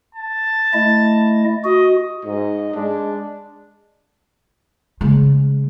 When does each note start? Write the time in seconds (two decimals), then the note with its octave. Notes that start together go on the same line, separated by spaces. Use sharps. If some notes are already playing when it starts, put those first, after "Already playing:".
0.15 A5
0.73 A3 E4 D#5
1.64 F#4 D#5
2.25 G#2 D#5
2.74 G#3 D4
5.01 C#3 G#3